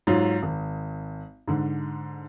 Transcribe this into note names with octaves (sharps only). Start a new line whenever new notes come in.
G#2 F#3 F4
G#1
G#2 D3